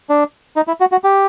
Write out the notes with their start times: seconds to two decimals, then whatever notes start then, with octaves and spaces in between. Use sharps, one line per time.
0.09 D4
0.56 D#4
0.67 E4
0.80 F#4
0.92 F#4
1.04 G4